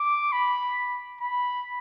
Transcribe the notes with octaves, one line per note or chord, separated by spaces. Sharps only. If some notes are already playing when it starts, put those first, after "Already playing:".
Already playing: D6
B5
B5